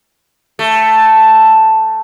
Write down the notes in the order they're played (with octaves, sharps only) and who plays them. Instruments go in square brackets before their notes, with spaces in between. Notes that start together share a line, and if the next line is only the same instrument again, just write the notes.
[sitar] A3